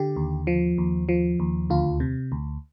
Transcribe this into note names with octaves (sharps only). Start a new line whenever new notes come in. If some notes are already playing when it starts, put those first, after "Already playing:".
Already playing: D3 G4
D#2
F3
D#2
F3
D#2
D2 F4
C3
D2